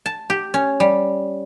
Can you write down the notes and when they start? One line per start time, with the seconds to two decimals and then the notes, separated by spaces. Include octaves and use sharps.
0.06 A5
0.30 G4
0.54 C#4
0.80 G3